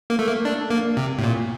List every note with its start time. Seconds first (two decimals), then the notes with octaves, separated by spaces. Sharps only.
0.10 A#3
0.19 A3
0.27 A#3
0.45 D4
0.70 A#3
0.97 C3
1.19 A2
1.24 A#2